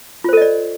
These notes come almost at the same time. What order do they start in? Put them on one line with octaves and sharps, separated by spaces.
F4 C5 A4 D#5 D5